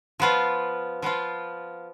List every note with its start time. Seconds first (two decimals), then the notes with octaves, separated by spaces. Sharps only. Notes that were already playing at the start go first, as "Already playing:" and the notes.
0.20 F3 B3 F4
1.02 F3 B3 F4